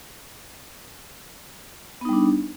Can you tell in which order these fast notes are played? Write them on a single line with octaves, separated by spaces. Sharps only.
B3 D#4 G3 D4